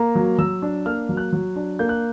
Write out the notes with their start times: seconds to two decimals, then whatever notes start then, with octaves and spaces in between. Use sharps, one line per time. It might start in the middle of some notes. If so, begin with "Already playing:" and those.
Already playing: A#3 A#5
0.15 F#3
0.38 F#3 E6
0.62 D4
0.86 A#3 F6
1.09 F#3
1.17 F#6
1.33 F#3
1.56 D4
1.79 A#3 G6
1.89 F#6